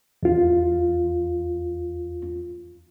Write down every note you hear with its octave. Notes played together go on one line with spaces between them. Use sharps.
E2 F4